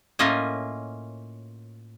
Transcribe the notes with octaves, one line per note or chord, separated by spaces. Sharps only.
A2 A#3 C#4 F4 D#5 G#5